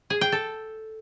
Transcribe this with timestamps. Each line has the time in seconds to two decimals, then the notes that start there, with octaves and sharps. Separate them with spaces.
0.10 G#4
0.21 G5
0.32 A4